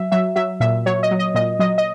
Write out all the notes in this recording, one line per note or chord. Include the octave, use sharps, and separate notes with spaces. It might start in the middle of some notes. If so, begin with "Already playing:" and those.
Already playing: F#3 E5
F#3 E5
F#3 E5
A#2 E5
F#3 C#5
D#5
F#3
D#5
A#2 D#5
F#3 D#5
D#5